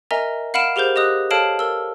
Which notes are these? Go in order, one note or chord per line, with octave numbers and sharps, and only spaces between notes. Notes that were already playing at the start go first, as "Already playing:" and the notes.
A#4 D#5 E5 G#5 A#5
F5 F#5 B5 F6 D7 E7
G4 G#4 A#4 C5 G6
G4 D#5 D#6 F#6
A4 C#5 F5 A5 F6 D7
A#4 E6